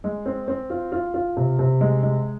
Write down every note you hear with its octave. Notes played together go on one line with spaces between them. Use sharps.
G#3
C4
C4
F4
F4
F4
C3
C3
G#3
G#3